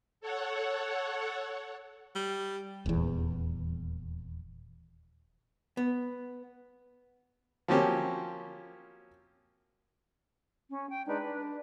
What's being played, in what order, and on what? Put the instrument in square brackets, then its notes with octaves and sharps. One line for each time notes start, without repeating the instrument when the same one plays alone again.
[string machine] A4 C#5 F#5
[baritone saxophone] G3
[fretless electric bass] D#1 E2
[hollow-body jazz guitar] B3
[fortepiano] F3 F#3 A#3 C4 C#4 G4
[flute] C#4
G5
[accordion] G#3 D4 D#4 [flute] B4
[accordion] D4